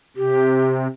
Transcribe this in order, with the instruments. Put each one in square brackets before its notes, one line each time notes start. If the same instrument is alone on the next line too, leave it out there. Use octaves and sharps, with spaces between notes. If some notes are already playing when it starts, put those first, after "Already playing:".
[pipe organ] C3 [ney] G4